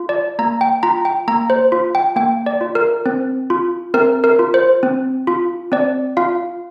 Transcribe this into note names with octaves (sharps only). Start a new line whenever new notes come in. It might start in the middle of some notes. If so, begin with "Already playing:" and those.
Already playing: F4
D5
A#3 A#5
G5
F4 A#5
G5
A#3 A#5
C5
F4
G5
A#3 G5
D5
F4
A#4
C4
F4
C4 A#4
A#4
F4
C5
C4
F4
C4 D5
F4 F5